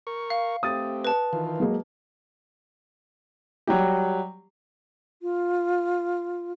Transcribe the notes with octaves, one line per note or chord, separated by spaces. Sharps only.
A#4 C#6
F5
A3 C4 G4 D#6 A6
B4 A5
D#3 E3 F4
F#3 G#3 A#3
F#3 G3 G4
F4